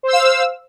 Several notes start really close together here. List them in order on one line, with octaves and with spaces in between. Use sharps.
C5 E6 F5